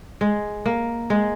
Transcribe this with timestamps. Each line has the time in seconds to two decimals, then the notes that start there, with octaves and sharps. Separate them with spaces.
0.21 G#3
0.66 A#3
1.10 G#3